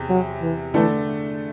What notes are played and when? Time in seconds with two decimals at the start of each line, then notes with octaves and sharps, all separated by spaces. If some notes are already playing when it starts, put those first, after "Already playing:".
Already playing: E2 C3
0.09 F#3
0.41 E3
0.74 D3 E3 A3 D4 A4